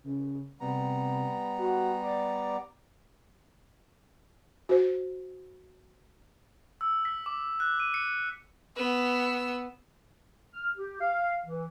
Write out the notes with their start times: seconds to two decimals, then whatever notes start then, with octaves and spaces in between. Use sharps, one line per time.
0.04 C#3
0.60 C3 G3 B3 A#5
1.58 F#4
2.03 D5
4.69 F#4 C5
6.81 E6
7.05 B6
7.26 D6
7.60 F#6
7.80 D#7
7.94 C#7
8.76 B3 E6
10.54 F6
10.76 G4
10.99 F5
11.46 E3